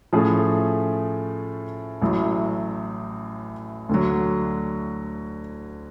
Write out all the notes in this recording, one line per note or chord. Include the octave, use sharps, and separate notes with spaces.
A2 F3 A3 C#4 G#4
A1 A2 F#3
D2 D3 F#3